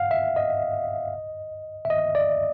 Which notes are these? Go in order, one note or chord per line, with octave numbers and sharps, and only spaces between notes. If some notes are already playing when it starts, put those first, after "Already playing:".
Already playing: F5 F#5
E5
D#5
E5
D#5
D5